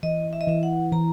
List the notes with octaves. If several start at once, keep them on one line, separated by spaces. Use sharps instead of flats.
E3 D#5
E5
D#5
E3 E5
F#5
E3 A#5